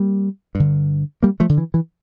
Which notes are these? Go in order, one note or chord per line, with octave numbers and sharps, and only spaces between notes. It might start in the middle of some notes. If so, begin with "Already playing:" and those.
Already playing: G3 A#3
G2
D3
G3 A#3
F3 A3
D3
E3
E3